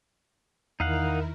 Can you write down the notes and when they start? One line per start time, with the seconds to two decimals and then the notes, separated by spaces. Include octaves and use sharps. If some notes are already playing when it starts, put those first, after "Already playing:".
0.80 E2 D#3 D#4 E4 A#4 F5 F#5